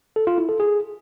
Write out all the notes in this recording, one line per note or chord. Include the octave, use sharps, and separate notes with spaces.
A4
F4
E4
A4
G#4